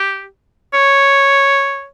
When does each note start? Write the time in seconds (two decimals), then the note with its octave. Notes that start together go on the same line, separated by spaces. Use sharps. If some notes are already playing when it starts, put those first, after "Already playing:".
Already playing: G4
0.74 C#5